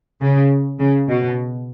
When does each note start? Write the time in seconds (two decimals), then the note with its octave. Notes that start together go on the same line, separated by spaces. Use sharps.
0.22 C#3
0.80 C#3
1.09 B2